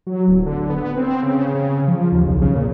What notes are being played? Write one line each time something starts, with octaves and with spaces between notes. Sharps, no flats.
F#3
D1
D3
B3
C4
C#3
C#3
F3
D#2
B1
C#3
A#2